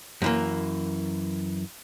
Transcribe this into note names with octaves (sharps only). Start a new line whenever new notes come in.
F#2 E3 A#3